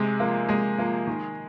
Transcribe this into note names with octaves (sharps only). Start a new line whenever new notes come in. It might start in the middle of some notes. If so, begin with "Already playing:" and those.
Already playing: C3 G#3 G#4
F3 A#3
C3 G#3 G#4
F3 A#3
D#3